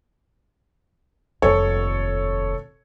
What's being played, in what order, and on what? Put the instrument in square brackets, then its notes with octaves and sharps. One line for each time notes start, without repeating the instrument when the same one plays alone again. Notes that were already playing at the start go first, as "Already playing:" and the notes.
[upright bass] F1 D#2 [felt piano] A4 C#5